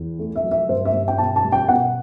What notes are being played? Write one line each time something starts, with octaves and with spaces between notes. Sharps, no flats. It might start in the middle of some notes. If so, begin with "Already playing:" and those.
Already playing: E2
A3
E5
F#3
E5
G2 C5
E5
G2
G5
B2 A5
A5
G3
G5
B2 F#5